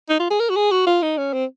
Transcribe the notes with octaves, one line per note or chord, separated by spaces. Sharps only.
D#4
F4
G#4
A#4
F#4
G#4
F#4
F4
D#4
C#4
C4